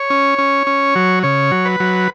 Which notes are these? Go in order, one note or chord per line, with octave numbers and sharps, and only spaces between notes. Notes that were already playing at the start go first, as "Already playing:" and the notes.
Already playing: C#5
C#4
C#4
C#4
F#3
C#3 C#5
F#3
B4
F#3